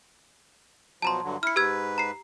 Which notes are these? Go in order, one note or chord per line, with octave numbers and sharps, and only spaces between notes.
B2 F3 F#3 A5 A#5 C6
G2 D3 F#3
E4 F6 C#7
G#2 G4 B4 E6 G#6
A#5 C7